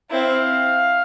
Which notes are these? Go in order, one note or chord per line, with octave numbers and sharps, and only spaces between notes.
C4 E4 F5